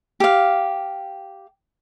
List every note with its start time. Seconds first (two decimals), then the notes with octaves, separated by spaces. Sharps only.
0.20 G4 F5